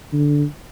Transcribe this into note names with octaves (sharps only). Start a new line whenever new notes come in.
D3